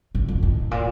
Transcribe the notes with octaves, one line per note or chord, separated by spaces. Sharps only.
A2
F2
A2
A#2